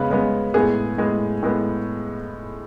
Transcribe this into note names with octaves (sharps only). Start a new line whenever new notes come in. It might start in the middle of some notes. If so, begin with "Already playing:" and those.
Already playing: C#3 G#3 B3 B4
C#3 G#3 B3
A2 G#3 B3 G#4
A2 G#3 B3
A2 G#3 B3